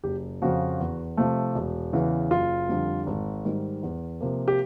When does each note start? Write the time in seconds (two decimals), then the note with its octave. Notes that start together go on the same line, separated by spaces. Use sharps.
0.04 F#1 G4
0.42 F2 C#3 F3 F#4
0.80 E2
1.17 C3 F3 A3
1.55 E1
1.93 E2 C#3 E3
2.31 F#1 F4
2.69 F2 D3 G3
3.06 G#1
3.45 G#2 D#3 G3
3.83 E2
4.21 C3 F3 A#3
4.48 G4